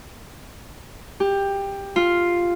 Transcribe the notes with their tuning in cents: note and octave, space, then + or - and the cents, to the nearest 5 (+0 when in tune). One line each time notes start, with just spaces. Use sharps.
G4 +15
F4 +0